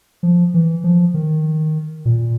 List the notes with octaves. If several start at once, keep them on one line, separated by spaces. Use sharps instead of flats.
F3
E3
F3
D#3
A#2